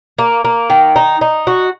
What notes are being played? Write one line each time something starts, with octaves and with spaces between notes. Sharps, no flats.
A#3
A#3
D#3
D#4
D#4
F#4